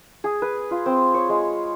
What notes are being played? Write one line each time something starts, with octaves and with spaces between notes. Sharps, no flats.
G#4
B4
F4
C4
C#5
G#3